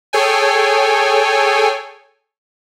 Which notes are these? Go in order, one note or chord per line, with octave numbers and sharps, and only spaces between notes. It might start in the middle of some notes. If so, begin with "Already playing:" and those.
G#4 A4 C#5 G5 G#5